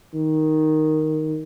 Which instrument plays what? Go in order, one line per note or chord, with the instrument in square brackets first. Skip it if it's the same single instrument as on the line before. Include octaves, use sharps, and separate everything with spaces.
[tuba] D#3